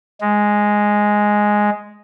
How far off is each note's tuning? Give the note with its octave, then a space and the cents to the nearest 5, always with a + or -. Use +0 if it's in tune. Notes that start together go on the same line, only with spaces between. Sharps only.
G#3 +0